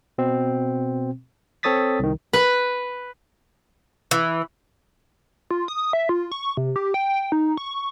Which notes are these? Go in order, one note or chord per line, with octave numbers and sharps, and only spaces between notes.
B2 C4
C4 A4 C#5 D#6 A6 B6
C2 D#3
B4
E3
F4
D#6
E5
F4
C#6
C3
G4
G5
G5
D#4
C#6